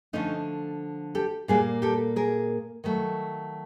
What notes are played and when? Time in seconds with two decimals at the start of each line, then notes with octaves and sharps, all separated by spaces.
0.13 D3 F3 A3 C#4 D#4
1.15 G4 A4
1.48 A#2 G3 A#3 F#4 G#4
1.82 G4 A4
2.16 G#4 A#4
2.84 D#3 F#3 A3